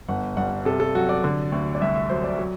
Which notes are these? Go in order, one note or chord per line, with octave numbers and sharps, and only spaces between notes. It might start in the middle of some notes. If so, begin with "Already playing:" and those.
G1 F#5
G2 F#5
C3 A4
A4
F#3 F#4
D5
D3
D2
D5
C2 E5
E5
F#3 C5
D5
F#3